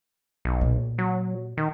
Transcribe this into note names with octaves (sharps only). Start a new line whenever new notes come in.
B1
A#2
F#3
D#3